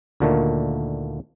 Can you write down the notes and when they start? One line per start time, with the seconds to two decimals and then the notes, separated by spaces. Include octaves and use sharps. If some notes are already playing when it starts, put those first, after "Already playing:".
0.20 D2 A#2 D3 D#3 A3 A#3